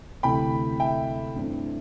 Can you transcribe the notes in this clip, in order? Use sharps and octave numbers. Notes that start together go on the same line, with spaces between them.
D2 C3 E3 A3 G5 B5
E5 G5
G2 E3 A3 C4